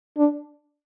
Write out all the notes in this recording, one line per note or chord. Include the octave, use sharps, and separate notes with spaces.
D4